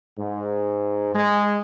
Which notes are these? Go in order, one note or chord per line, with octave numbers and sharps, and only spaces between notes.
G#2
G#3